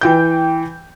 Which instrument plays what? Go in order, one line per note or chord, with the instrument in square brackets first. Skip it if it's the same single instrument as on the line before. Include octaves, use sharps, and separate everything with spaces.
[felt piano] E3 G5 G6